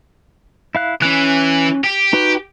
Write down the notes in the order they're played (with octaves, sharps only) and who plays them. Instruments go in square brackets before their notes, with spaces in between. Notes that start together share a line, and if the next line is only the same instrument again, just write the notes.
[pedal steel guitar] E4 F5 F#6
[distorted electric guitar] E3 [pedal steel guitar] C#4 F#6
[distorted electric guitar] G4
[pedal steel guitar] D#4 F#4 B4